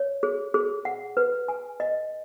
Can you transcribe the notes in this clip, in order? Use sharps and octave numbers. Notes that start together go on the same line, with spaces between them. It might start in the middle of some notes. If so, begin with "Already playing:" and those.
Already playing: C#5
G#4
G#4
F#5
B4
G#5
D#5